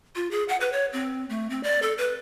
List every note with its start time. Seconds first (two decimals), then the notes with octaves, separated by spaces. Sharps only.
0.15 F4
0.31 G#4
0.49 F#5
0.61 B4
0.72 C#5
0.93 C4
1.30 A3
1.50 C4
1.63 D5
1.82 A4
1.98 B4